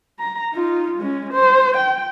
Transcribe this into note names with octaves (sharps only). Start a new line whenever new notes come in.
A#5
D#4 F4
G#3 C#4
C5
G5